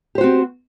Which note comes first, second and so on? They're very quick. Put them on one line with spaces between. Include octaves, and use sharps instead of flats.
G4 C5 F#4 C4